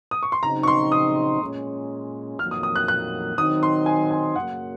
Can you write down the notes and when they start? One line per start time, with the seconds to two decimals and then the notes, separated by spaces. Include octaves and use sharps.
0.11 D#6
0.23 C#6
0.32 C6
0.43 C#3 F#3 C4 D#4 A#5
0.63 C#6
0.67 C6
0.92 D#6
1.41 A#2 G#3 C#4
2.39 F2 D#3 F#3 A#3 F6
2.51 D#6
2.63 D#6
2.76 F#6
2.88 F#6
3.37 D#3 F#3 C4 D#4 D#6
3.63 C6
3.86 G#5
4.11 G#5
4.36 F#2 C#3 F#3 A#3 F#5